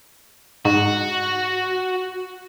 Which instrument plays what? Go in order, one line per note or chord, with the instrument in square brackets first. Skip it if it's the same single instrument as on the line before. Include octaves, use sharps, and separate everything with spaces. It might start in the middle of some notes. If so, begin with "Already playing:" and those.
[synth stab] G#2 [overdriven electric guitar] F#4